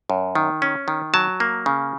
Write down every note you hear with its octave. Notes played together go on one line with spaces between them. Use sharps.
F#2
D#3
C#4
D#3
F#3 A5
A#3
C#3